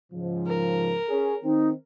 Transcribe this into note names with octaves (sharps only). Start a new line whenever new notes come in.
G#2 C#3 F3
A#4
C#4 G#4
D#3 C4 D#4